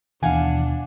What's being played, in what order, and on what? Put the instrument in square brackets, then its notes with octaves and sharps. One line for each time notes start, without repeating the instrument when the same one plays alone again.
[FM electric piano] D#2 B2 [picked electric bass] E3 [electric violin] D4 [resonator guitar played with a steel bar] F5 F#5 G#5